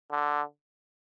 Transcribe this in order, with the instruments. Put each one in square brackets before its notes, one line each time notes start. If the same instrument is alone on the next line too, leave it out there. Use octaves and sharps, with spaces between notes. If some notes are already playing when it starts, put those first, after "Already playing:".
[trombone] D3